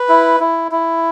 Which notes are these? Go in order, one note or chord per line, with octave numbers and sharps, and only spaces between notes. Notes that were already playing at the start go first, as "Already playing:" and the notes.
Already playing: B4
E4
E4
E4